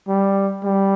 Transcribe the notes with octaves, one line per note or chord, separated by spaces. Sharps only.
G3
G3